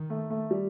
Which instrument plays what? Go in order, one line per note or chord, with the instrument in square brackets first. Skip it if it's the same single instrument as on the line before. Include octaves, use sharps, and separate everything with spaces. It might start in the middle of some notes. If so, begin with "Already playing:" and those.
Already playing: [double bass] D#3
[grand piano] A3
A3
G3